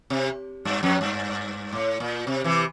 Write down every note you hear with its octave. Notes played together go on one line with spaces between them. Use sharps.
C3
G2
F2
G2
A2
A#2
C3
C3 E3